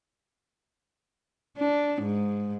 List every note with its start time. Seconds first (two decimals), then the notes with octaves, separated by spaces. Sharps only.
1.58 D4
2.01 G#2